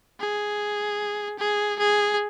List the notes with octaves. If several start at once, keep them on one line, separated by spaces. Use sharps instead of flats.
G#4
G#4
G#4